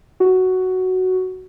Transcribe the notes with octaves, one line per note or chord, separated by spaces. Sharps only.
F#4